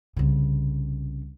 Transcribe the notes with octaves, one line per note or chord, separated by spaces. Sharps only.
C2 C#3